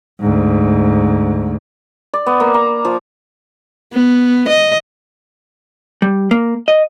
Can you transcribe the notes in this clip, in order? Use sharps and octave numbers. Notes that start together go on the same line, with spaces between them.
D2 G#2
D5
B3
A#3
A#5
F3
B3
D#5
G3
A#3
D#5